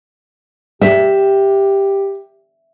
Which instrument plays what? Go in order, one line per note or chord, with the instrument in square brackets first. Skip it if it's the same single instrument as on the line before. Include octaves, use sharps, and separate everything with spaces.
[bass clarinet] G4 [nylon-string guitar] E5